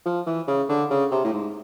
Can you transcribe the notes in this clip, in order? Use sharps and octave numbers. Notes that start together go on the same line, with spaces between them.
F3
E3
C#3
D3
C#3
C3
A2
G#2